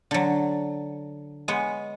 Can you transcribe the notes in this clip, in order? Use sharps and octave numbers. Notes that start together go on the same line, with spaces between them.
D3 F#3
G#3 B3 C#5